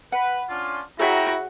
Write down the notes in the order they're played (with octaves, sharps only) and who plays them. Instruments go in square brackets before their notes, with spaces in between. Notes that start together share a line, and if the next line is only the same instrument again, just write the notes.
[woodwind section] B4 [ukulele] F#5
[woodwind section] C#4 D4 F4
[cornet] E4 [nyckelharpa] F#4 [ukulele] G#4 C#5 E5 [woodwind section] G5 A#5